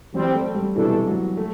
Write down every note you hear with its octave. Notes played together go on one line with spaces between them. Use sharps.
E3 F#3 G3 C4
A3
G3
C2 B2 E3 A3 D4 A4
F#3
A3